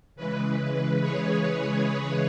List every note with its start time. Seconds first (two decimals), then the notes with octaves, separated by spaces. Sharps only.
0.16 C#3 E3 G#3 B4
0.73 B4
1.01 G#4 C#5
1.87 B4